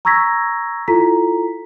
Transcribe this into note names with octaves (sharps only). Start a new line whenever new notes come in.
A#5 C#6 E6 G#6 A#6 B6
E4 F4 A4 A#5 B6